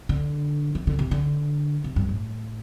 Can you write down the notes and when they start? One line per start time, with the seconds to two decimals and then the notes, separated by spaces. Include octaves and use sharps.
0.09 D3
0.75 E3
0.87 D3
0.99 C3
1.11 D3
1.84 C3
1.96 G2
2.09 A2